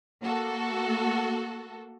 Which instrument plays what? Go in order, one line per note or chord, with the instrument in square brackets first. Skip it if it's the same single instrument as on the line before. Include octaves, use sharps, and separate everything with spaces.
[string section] A#3 F#4 A4